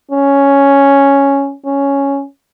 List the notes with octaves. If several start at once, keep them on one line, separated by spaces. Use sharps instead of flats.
C#4
C#4